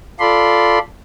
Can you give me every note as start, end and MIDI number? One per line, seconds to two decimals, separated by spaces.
0.20 0.79 65
0.20 0.79 69
0.20 0.79 74
0.20 0.79 83
0.20 0.79 84